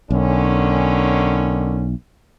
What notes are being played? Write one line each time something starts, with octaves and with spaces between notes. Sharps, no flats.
B1 D3 D#3 C#4